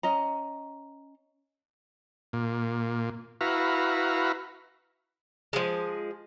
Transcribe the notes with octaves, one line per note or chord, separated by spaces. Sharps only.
C#4 D#5 A#5
A#2
E4 F#4 B4 F5 A#5
F3 G#3